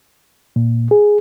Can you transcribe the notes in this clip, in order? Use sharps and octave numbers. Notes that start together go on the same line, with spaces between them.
A#2
G#4